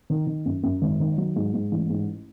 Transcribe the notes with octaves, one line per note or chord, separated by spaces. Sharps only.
D#3
D#3
F#2
F#2
G#1
D#3
F#3
G#2
G#2
A1
G#2